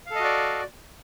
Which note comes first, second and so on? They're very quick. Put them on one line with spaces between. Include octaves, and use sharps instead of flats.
F5 A4 D#5 F#4 D5